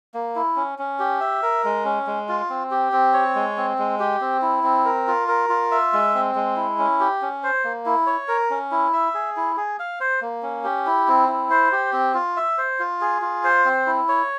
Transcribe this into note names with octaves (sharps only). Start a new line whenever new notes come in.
A#3
E4
C#4
C#4
G4
E5
A#4
G#3
C#4
G#3
F4
C4
G4
C4
C#5
G#3
C4
G#3
G4
C4
E4
C4
A#4
F4
A#4
F4
E5
G#3
C4
G#3
E4
C#4
G4
C#4
C5
A#3
E4
C#5
A#4
C#4
E4
E5
G#4
E4
G#4
F5
C5
A#3
C#4
G4
E4
C4
E4
C5
G4
C4
F4
E5
C5
F4
G#4
F4
C5
C4
E4
C#5